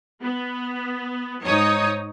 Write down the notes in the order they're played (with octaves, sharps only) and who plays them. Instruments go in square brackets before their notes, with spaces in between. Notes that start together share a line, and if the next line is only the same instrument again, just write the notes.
[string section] B3
G#2 D#4 C#5 D#6